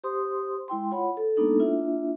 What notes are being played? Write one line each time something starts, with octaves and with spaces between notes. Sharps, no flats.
G4 C5 C6 D#6
G#3 E4 G5 C6
F4 C#5 F#5 B5
A4
G#3 A#3 B3 D4 D#4 A4
A#3 D4 E4 F4 E5